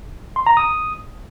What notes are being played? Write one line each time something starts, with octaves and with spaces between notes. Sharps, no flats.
C6
A#5
D#6